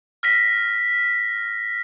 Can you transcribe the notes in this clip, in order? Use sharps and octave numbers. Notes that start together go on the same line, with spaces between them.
F6 A#6 B6